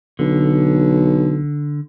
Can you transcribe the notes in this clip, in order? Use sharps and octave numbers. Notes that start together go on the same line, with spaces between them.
B1 D3